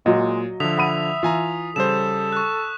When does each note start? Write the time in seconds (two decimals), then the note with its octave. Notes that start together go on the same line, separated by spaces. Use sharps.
0.06 A#2 F#3 G#3 D#5
0.60 D3 F3 E5 D#6 B6 F7
0.78 F#5 B5 D#6 D#7
1.23 E3 F4 G#5 A#5
1.76 C#3 G3 A4 C5 E7
2.32 C#6 F#6